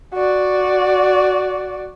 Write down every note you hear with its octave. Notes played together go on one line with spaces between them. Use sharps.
F#4 D5